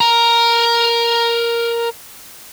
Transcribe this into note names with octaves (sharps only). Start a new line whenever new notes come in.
A#4 A#5